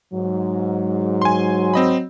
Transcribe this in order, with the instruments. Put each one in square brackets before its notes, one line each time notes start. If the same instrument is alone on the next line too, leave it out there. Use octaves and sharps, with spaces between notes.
[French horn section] G#2 [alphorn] F#3
[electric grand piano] G#5 C6
C4 D#5 B5